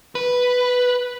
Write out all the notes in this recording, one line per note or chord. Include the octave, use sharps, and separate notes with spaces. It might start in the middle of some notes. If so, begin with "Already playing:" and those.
B4